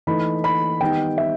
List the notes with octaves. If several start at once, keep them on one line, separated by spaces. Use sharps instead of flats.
E3 A3 D#4 B5
B5
D#3 G3 B3 D#4 G5
E5